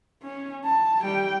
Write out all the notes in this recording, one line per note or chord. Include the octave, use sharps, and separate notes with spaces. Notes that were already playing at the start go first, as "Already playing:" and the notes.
C#4
A5
G3 G5